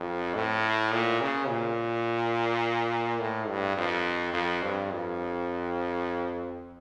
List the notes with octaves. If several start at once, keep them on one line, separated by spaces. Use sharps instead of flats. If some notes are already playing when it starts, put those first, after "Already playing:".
Already playing: F2
A2
A#2
C#3
A#2
A2
G2
F2
F2
G2
F2